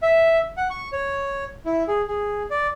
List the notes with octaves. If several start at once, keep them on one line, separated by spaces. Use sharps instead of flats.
E5
F#5
C#6
C#5
E4
G#4
G#4
D5